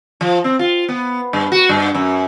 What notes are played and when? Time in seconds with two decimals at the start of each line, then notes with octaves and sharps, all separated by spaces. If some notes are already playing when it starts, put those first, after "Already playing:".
0.21 F3
0.44 C4
0.59 F4
0.88 B3
1.33 G2
1.52 F#4
1.69 G2
1.94 F#2